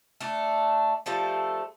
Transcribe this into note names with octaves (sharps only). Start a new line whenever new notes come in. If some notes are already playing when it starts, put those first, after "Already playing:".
A3 D4
F3 G3 A3 A4